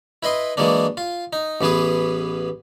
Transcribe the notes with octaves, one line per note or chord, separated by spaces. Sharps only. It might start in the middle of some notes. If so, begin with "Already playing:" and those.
E4 B4 D#5 C6
E3 F#3 G#3 A#3 D4
F4
D#4
A1 E3 B3 G#4 B4